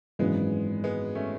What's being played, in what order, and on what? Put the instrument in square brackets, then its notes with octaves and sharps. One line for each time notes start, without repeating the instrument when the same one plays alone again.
[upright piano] G#1 F#2 E3 [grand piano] G#3 B3
[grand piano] G#3 B3
A3 C#4